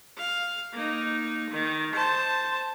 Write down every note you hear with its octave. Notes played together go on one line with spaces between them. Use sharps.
F5
A#3 D#4
D#3
C5 A5